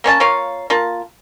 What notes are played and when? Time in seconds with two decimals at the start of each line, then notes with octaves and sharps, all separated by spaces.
0.04 A#3 C#4 C#5 A5
0.20 A#3 F4 C#5 F5
0.70 A#3 F4 A5